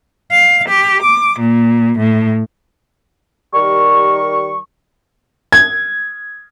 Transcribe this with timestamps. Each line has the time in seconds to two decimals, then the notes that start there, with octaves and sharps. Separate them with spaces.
0.31 F5
0.69 G4
1.03 D6
1.40 A#2
1.98 A2
3.53 D#3 G3 G4 A#4 C#6
5.52 G#6